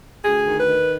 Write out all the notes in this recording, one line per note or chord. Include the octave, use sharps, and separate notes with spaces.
D2 G#4
D#3
B4
D#3